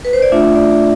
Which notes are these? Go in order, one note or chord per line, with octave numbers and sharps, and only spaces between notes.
B4
C5
D5
A3 D4 F4 E5
D5